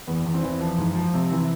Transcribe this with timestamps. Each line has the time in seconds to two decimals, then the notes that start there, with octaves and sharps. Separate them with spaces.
0.07 E2 B3
0.25 E2
0.34 C4
0.43 E3
0.61 F3
0.78 G#2
0.96 F3
1.14 C3
1.31 E3